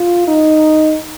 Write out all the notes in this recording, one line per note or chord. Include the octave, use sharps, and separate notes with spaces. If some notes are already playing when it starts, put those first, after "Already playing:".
Already playing: F4
D#4